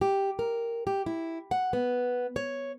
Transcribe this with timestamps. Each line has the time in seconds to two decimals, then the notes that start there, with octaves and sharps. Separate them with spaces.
0.01 G4
0.39 A#4
0.87 G4
1.06 E4
1.51 F#5
1.73 B3
2.36 C#5